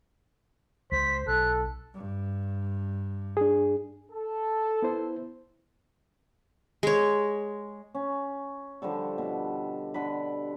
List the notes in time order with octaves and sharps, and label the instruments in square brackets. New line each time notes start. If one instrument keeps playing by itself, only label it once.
[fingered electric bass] C#2 [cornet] C5 [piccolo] B6
[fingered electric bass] B1 [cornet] A4 [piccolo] F#6
[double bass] G2
[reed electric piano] D4 G#4
[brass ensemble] A4
[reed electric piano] B3 E4 C5
[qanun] G#3 C#5
[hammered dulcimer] C#4
D3 F3 G3 A4
B2
D3 B4 B5